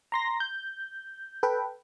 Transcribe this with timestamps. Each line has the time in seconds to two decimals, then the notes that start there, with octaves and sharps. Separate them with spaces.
0.12 A#5 C6 A#6
0.40 G6
1.43 A4 B4 G5